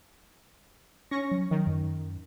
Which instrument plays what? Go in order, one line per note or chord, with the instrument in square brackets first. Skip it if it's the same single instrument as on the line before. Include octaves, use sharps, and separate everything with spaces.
[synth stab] C#4 C#6 A#6
[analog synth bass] F#3
[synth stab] D#3 [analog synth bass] F#3
[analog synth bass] F#2